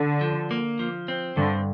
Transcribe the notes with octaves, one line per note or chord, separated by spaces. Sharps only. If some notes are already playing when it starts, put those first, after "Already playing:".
Already playing: D3
F3
A#3
F3
C4
G2 D3